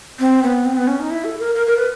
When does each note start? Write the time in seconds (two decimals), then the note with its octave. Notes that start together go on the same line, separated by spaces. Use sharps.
0.20 C4
0.43 B3
0.65 C4
0.77 B3
0.87 C#4
0.99 D#4
1.11 E4
1.25 A4
1.40 A#4
1.55 A#4
1.67 A#4
1.77 B4